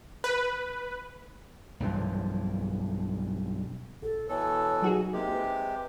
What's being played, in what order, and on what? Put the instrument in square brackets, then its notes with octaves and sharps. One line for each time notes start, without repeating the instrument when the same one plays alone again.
[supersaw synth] B4
[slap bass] B1 G2 E3 F3
[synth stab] A#1 [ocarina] A4
[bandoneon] B2 E3 A4 [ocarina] C#5
[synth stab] F#3 F#4 G#4 [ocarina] D#4
[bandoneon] C3 G#3 G4 [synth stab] A#3
[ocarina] B4